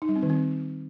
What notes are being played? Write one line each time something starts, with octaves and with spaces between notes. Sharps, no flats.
D#4
G3
C4
D#3
C4